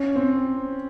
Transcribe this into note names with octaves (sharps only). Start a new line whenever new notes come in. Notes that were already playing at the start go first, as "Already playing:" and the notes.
Already playing: C#4
C4